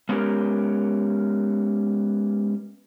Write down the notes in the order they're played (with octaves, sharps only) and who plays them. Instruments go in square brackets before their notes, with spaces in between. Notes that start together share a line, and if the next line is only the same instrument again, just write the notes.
[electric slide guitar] G#3 B3 C#4 G4 A#4